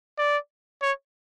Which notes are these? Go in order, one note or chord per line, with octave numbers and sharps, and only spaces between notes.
D5
C#5